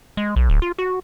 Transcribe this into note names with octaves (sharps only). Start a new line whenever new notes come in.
G#3
B1
D1
F4
F#4